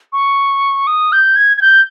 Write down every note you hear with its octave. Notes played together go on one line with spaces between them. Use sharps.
C#6
D#6
G6
G#6
G#6
G6